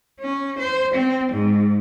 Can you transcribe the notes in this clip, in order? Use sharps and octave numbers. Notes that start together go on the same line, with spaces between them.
C#4
C5
C4
G#2